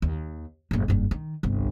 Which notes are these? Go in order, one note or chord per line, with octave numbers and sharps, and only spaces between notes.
D#2
F#1 A2
F#1 G2
D#3
G1 C2